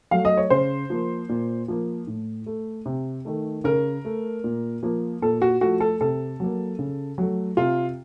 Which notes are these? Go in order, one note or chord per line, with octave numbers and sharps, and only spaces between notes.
F#3 A3 F5
D#5
C#5
C#3 C5
F3 A#3
A#2
F3 A#3
A2
A3
C3
D#3 A3
C#3 A#4
A3
A#2
F3 A#3
A#2 A4
F#4
F3 A3 F#4
A4
C3 A4
F#3 A#3
C#3
F#3 A3
C3 F4